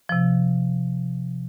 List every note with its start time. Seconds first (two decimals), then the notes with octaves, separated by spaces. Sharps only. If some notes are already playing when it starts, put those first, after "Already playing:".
0.09 C3 F3